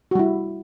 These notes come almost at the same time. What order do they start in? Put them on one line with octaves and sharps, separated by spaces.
F#4 G3 E4